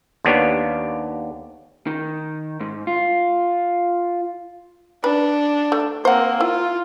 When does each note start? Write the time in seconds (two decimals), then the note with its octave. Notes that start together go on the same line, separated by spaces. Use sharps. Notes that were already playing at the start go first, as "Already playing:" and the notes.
0.25 D#2 A#3 B3 D4 G4 C#5
1.87 D#3
2.60 G#2
2.87 F4
5.04 D4 B4
5.72 A3
6.05 A#3 C4 C5 F#5
6.41 E4 F4